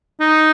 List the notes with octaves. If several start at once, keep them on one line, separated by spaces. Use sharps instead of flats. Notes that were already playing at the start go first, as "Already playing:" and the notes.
D#4